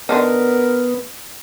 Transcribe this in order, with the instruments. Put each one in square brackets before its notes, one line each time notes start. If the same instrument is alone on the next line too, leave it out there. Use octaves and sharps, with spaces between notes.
[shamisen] D3 D4 D#4 [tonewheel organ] B3 [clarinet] A#4